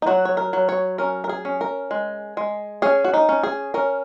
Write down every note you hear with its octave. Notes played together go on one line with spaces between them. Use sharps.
D#4
F#3 F#4
C#5
A#4
F#3
C#5
C#4 A#4
A#4
G#4
C#4
A#4
G#3
G#3
C#4 G#4
F#4
D#4
C#4
G#4
C#4 A#4